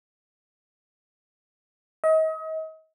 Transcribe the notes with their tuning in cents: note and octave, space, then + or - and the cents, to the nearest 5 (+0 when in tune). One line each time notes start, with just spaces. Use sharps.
D#5 +35